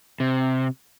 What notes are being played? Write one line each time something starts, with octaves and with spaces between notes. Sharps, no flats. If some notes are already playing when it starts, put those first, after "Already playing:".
C3